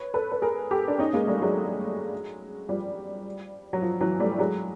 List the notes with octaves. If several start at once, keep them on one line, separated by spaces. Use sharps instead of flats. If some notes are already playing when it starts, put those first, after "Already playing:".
Already playing: B4 C#5
A4 B4
B4
G#4 A#4
G4 A4
D4
C#4 D#4
G#3 A#3
G3 A3
F#3 G#3
F3 G3
F#3
F3
E3 F#3
G3 A3
F#3 G#3